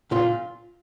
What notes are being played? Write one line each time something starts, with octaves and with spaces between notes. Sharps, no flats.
A#2 F4